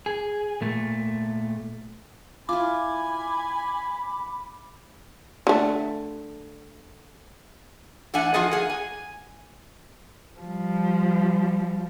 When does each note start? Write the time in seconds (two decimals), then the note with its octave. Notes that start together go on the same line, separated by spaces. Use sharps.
0.06 G#4
0.62 A#2 A3
2.49 E4 F4 G#5 B5 D6
5.47 D3 A3
8.14 E3 A3 D4 E5 F#5 G#5
8.34 F3 F4 F#4 G#4 A4 D#5
8.51 A#3 G#4 F#5
8.70 G#5
10.40 F3 G3